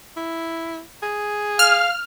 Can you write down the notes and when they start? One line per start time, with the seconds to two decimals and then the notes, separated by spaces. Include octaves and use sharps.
0.17 E4
1.03 G#4
1.59 F5 F6